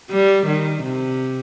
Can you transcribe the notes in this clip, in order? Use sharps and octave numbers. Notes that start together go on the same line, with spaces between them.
G3
D#3
C3